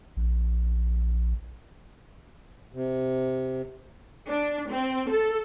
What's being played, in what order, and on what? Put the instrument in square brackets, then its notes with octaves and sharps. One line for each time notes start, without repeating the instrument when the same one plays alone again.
[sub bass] A#1
[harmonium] C3
[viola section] D4
C4
A4